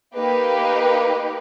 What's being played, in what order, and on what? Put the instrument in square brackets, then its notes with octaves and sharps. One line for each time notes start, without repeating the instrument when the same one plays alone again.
[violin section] A#3 D#4 G4 B4